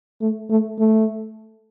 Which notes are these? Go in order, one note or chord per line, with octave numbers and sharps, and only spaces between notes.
A3
A3
A3